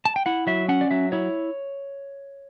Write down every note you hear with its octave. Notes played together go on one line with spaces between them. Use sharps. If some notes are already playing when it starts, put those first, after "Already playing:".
A5
G5
E4 F#5
F#3 E5
C#4 F#5
D5
F#3 E5
E4 C#5